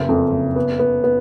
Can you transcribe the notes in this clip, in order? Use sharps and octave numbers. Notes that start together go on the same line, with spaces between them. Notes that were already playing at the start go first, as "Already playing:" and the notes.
Already playing: F#1 B3
F2
F#1
B3
B3
B3